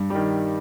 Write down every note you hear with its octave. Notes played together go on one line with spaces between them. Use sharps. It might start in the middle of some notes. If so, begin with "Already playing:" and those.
Already playing: G2
D#3 G3